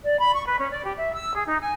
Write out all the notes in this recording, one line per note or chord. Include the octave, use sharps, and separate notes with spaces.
D5
B5
C#6
B4
C#4
D5
G4
E5
E6
G#4
D#4
G#5